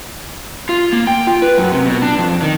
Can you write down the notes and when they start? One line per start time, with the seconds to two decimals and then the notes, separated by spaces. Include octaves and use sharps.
0.69 F4
0.93 A#3
1.07 G5
1.27 F4
1.42 B4
1.58 F#2
1.72 C3
1.86 B2
2.02 D4
2.18 F2
2.42 D#3